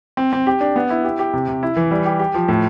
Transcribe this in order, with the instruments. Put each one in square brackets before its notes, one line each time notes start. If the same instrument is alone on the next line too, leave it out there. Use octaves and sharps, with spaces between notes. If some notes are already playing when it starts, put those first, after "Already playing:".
[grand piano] C4
C4
G4
D4
B3
E4
G4
G4
C3
C3
E4
E3
G3
G4
G4
F3
A2